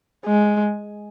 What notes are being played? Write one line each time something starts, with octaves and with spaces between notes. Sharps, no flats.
G#3